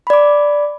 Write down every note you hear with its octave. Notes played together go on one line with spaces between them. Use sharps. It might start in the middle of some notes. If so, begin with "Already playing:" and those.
D5 B5 D6